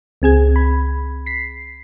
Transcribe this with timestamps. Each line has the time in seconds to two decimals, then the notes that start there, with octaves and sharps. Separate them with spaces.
0.22 C#2 C4 G#4 G#6
0.56 B5
1.26 B6 C7